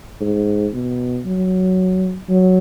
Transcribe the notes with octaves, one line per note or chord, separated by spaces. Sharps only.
G#2
B2
F#3
F#3